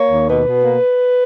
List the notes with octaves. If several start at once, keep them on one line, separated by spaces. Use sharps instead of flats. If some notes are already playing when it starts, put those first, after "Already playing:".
Already playing: A#3 C#5
D#2
B2 B4
B2
A#3